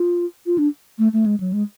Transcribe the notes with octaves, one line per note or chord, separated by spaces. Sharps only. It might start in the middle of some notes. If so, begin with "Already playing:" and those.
Already playing: F4
F4
D4
A3
A3
G#3
F#3
G#3